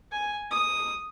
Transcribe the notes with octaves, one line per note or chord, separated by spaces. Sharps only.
G#5
D#6